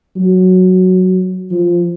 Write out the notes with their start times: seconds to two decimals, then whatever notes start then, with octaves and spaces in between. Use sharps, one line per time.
0.16 F#3
1.51 F3